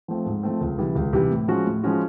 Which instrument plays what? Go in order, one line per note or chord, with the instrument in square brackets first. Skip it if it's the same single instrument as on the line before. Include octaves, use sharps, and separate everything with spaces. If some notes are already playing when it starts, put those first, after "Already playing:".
[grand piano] F3 A3 C4
G#2
F3 A3 C4
C#2
C3 E3 G3
C#2
C3 E3 G3
A2
F3 G#3 C#4 F#4
A2
F3 G#3 C#4 F#4